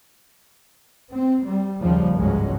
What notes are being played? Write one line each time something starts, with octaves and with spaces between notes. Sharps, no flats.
C4
G3
D#2 C#3 F3 G3
G1 C#2 G#2 F#3 G#3 C#4